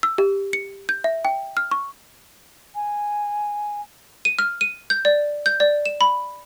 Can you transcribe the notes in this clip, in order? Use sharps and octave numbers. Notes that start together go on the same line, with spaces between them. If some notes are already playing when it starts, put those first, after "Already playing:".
E6
G4
C#7
G6
E5
G5
F6
C#6
G#5
D#7
F6
D#7
G6
D5
G6
D5
E7
B5